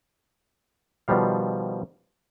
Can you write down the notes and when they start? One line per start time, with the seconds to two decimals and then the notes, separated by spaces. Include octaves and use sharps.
1.08 B2 D#3 F3 G3 F5